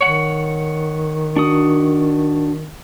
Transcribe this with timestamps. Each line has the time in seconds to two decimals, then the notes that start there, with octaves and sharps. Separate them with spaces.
0.01 D#3 C#5 F#5
1.36 D4 F#4 D#6